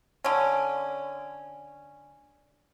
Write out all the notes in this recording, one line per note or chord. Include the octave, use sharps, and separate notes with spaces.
D3 C#4